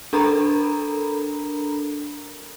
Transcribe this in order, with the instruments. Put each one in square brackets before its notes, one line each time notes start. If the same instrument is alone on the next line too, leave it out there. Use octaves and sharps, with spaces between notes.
[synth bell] D4 A4 A#4 A#5 B5